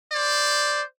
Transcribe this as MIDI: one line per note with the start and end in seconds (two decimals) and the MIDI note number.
0.12 0.83 72
0.12 0.83 74